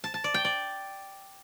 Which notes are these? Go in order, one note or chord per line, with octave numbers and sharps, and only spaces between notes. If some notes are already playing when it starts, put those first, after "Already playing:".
A5
A5
D5
G5
D5